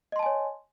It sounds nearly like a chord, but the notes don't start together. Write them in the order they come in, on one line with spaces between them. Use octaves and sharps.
D#5 C6 A5 G#5 C#5